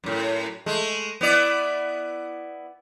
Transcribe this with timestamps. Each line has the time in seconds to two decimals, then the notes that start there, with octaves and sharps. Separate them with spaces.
0.04 F#2 A2
0.66 G#3 A3
1.21 B3 E4 D5